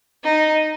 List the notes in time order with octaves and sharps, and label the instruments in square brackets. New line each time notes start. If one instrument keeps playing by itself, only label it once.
[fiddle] D#4